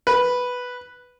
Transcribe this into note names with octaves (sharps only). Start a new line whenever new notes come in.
B4